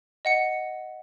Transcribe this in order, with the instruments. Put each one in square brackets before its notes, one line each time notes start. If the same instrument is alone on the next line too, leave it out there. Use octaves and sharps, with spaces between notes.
[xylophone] D#5 F#5 C#7